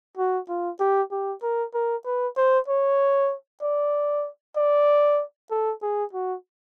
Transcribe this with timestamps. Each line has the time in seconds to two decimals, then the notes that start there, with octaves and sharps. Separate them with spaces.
0.17 F#4
0.49 F4
0.80 G4
1.12 G4
1.43 A#4
1.74 A#4
2.06 B4
2.37 C5
2.68 C#5
3.62 D5
4.57 D5
5.51 A4
5.82 G#4
6.13 F#4